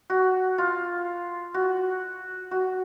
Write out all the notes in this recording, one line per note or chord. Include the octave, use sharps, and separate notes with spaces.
F#4
F4
F#4
F#4